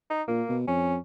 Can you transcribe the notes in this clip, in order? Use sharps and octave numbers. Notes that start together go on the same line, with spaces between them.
D#4
A#2 A#3
B2
F2 C#4